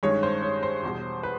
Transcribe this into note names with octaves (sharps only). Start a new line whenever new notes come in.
G2 D#3 G#3 C#4 C#5
C5
C#5
C5
E2 B2 G3
B4